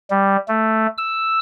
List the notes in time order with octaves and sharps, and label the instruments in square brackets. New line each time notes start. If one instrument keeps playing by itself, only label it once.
[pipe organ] G3
A3
E6